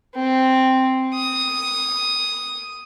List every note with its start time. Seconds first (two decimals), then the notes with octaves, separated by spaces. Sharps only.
0.16 C4
1.14 D#6